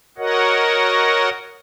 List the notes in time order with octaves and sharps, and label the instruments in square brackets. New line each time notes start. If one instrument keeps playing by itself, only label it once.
[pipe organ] F#4 A#4 C#5 D#5 F#5